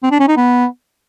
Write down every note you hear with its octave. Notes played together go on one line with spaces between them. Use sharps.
C4
D4
C#4
D#4
B3